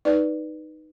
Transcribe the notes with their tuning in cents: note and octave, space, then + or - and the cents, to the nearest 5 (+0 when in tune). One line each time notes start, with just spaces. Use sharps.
D#4 -5 B4 -5 D5 +0